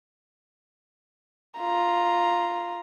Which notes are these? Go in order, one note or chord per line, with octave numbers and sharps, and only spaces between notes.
F4 A#5